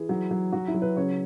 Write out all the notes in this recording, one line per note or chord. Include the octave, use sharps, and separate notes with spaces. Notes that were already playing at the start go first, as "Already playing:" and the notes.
Already playing: E3 G#4
F#3
F#3
F#3 F#4
E4
F#3
B4
C#3 C#5